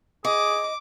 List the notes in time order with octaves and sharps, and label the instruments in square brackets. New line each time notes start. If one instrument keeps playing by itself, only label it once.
[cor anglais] G#4 [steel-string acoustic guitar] D#5 [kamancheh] D6